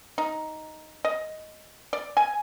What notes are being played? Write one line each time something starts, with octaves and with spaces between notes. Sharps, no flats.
D#4
D#5
D5
G#5